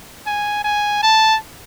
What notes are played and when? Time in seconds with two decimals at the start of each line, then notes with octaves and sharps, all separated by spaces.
0.27 G#5
0.64 G#5
1.03 A5